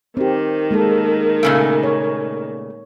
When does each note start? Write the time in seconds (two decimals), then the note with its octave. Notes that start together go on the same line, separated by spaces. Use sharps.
0.17 D#3 C4 G4
0.71 G#3 A#3 A4
1.43 A#2 C#3 A3
1.83 C#5